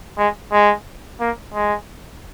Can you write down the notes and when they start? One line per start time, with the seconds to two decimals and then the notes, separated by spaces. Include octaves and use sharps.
0.18 G#3
0.52 G#3
1.20 A#3
1.54 G#3